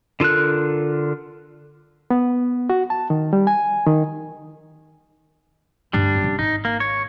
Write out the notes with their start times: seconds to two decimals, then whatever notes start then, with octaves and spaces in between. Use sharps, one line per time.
0.20 D3 F4 A4 A#4 F#6
2.10 B3
2.70 F#4
2.90 A5
3.10 D#3
3.33 G3
3.47 G#5
3.86 D#3
5.93 D2 G2 G3 D4
6.22 C3 C#4
6.39 G#1 D#4
6.65 A#3
6.80 C#5